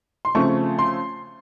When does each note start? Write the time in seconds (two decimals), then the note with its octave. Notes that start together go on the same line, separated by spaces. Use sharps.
0.25 C6
0.35 C#3 F3 A3 C4 C#6
0.79 C6